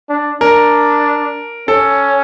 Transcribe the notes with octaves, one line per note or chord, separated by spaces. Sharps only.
D4
D4 A#4
C#4 A4